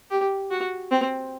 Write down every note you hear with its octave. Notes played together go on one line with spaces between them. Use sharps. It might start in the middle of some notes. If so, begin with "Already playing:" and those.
G4
F#4
C4